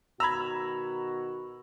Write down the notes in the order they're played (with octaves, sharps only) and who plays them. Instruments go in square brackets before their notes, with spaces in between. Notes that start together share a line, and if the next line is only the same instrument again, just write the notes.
[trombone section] B2 D#3 F#4 [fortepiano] A#5 B5 [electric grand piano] E6 G#6